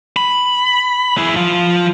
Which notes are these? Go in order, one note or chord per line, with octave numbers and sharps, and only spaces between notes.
B5
E4 G#4
F3 F4